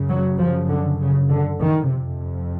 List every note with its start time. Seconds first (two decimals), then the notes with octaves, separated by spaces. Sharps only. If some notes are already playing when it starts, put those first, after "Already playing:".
Already playing: F#2 C#3
0.09 F#3
0.39 F3
0.68 D3
0.99 C#3
1.29 D3
1.59 D#3
1.89 F2 C3